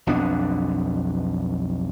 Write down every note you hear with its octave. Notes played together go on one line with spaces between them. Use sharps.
B1 F2 B3 D4